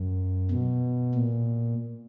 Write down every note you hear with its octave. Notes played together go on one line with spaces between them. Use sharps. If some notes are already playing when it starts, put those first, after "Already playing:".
Already playing: F#2
B2
A#2